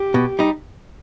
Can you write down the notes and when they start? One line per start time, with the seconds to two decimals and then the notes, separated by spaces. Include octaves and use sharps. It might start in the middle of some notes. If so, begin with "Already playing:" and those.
Already playing: G4
0.14 B2
0.39 G3 D#4